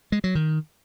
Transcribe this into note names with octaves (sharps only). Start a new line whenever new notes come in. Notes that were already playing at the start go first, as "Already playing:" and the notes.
G#3
F#3
D#3